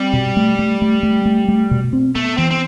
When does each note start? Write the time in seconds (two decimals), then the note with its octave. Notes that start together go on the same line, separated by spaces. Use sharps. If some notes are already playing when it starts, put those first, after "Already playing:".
Already playing: G3 C4
0.13 B2
0.37 A3
0.59 A3
0.82 A3
1.03 A3
1.26 A3
1.48 A3
1.71 B2
1.93 C4
2.15 A3 B3
2.37 E3 C4
2.51 C4